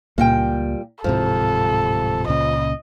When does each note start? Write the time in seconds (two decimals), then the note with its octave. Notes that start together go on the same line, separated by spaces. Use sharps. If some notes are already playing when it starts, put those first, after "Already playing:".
0.18 C#2 A#2 G3 A#3 G5
1.04 D1 G#2 C3 F3 A4
2.28 C#2 A#2 C#3 D#5